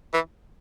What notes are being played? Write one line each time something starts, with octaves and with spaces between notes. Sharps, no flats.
E3